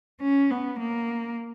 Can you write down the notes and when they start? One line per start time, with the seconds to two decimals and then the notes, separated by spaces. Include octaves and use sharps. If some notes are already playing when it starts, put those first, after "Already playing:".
0.21 C#4
0.50 B3
0.79 A#3